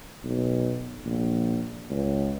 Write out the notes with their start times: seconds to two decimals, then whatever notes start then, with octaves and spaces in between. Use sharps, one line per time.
0.24 B1
1.06 A#1
1.90 C#2